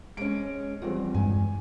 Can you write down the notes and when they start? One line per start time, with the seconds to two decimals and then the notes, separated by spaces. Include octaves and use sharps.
0.17 G#3 C#4 D7
0.82 E2 F3 G3 C4
1.14 G2 G#3 G#5